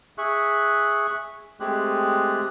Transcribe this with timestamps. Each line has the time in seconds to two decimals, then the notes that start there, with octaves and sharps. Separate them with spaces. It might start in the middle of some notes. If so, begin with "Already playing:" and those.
0.18 G#4 E5 C#6 F#6
1.60 G#3 A3 C4 G4 G#4 F#6